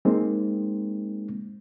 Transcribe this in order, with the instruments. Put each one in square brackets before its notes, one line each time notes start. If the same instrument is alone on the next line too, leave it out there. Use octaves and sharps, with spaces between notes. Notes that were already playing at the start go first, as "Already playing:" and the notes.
[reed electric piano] G#3 A#3 C4 D#4